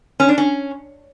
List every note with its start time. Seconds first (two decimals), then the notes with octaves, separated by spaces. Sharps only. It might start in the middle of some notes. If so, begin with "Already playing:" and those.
0.20 C#4
0.29 D4
0.38 C#4